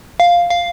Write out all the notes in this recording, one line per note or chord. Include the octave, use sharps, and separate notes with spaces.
F5
F5